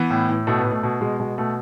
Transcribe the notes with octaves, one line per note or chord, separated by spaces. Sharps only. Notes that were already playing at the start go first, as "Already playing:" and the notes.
Already playing: E3 B3
A2
A2
B2 A3
B3
B2
A3
B2
B2 G#3
B2 G#3
B2 A3